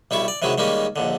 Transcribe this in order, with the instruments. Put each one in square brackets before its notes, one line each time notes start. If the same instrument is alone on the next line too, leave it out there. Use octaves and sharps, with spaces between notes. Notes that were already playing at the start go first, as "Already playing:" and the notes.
[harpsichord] B1 G3 E4 C#6
D5
C3 D#3 F#3 G#3 E4
D#3 G3 G#3 A#3 C#4
A#1 D#2 D3